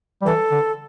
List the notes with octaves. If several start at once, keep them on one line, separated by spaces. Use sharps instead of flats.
G3
E3 A4
D3